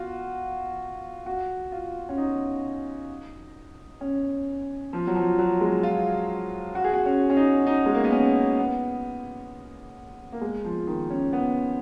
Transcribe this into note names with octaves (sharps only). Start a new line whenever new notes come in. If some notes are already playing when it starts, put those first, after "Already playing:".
Already playing: F4 F#4
F#4
F4
C#4
D#4
C#4
F3
F#3
F3
F#3
G#3
F4
F#4
G#4
F#4
C#4
C#4
D#4
D#4
G#3
A#3
B3
C#4
B3
A#3
G#3
F3
D#3
C#4
B3